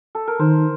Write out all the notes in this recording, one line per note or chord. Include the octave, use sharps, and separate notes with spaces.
A4
A#4
D#3 C5